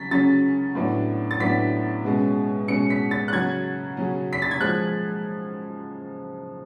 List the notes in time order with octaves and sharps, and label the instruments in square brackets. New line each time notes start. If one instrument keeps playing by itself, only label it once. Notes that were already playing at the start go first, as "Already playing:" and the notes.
Already playing: [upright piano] C#3 F#3 A6 B6
C#3 F#3 C#4 A6
A2 F#3 B3 D4
A6
A2 F#3 B3 D4 B6
B2 G#3 C#4
B2 G#3 C#4 C#7
B6
A6
F#6
C#3 F#3 C#4 G#6
C#3 F#3 C#4
B6
A6
G#6
F3 G#3 F#6